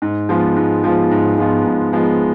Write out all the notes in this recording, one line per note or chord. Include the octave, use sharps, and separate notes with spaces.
G#2
F3 G#3 B3 F4
G#2
F3 G#3 B3 F4
G#2
F3 G#3 B3 F4
G#2
F3 G#3 B3 F4